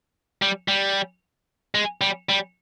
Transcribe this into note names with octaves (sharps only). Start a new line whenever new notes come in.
G3
G3
G#3
G3
G3